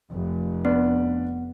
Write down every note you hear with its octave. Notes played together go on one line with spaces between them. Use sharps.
F1
B3 D4 B4 D5